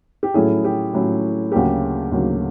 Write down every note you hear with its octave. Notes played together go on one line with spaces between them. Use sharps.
G4
A2 F#3 A3 C#4 E4 G#4
G4
A2 F#3 A3 C#4 E4
D2 C#3 F#3 A#3 G4
D2 C#3 F#3 A#3